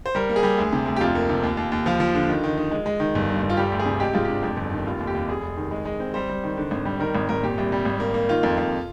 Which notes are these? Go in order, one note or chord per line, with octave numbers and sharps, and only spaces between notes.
C5
G3 A#4
A#3
G#4
G3
D2
C3
D2
G4
F2 F4
A#3
C3
D#2
D#2
D#2
F3 F4
F3
D3
D#3
D#3
D#4
G#3
G#3
D#3
G1
G2
G1
F4
G3 G4
D2
G#4
C3
G#3 G4
G#2 F4
D4 G4
F2
G1
D#3
F1 F4
D#2
G4
D#2
F1 G#4
F1
D#3
G#3
G#3
C4
G3 C5
G3
D#3
D3
G#1
G3
D#3 A#4
G#1
G#1 A#4
A#2 G4
C2
G3
G#1
A#3
A#3
D#3 F4
F2
F2